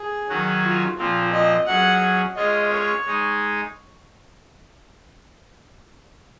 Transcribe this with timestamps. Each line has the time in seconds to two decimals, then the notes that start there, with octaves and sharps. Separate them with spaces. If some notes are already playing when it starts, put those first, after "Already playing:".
Already playing: G#4
0.29 D#3 F#3 C#4 F#4
0.64 F4
0.98 A#2 F3 C4 F4
1.32 D#5
1.66 F#3 C#4 G#4 F#5
2.36 G#3 C#4 F4 G#4 D#5
2.71 C#5
3.05 G#3 D#4 G#4